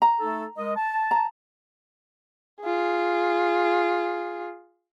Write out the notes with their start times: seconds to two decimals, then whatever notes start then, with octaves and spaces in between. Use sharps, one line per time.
0.02 A#5
0.19 A3 D#4 A4
0.57 G#3 A#4 D#5
0.76 A5
1.11 A#5
2.61 F4 G#4